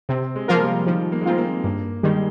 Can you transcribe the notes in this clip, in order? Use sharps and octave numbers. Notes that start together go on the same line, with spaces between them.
C3 C4
G#3
F3 A#3 F4 A#4
G3
D#3 F3
A#3
G#3
A#3 C4 F4
A#3
G2 A#3
D#3 G3 G#3